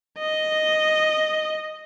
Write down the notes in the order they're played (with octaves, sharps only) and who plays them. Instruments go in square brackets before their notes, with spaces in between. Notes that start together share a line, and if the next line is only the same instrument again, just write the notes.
[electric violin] D#5